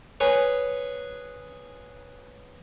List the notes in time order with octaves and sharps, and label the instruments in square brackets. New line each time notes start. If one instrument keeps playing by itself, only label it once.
[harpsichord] G#4 B4 C#5